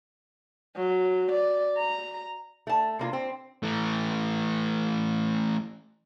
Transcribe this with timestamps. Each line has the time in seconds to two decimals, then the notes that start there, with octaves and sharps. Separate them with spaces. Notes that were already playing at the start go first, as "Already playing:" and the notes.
0.76 F#3
1.31 D5
1.78 A#5
2.67 A3 A5
2.99 C3 A#3 F4
3.13 C4
3.63 E3 A3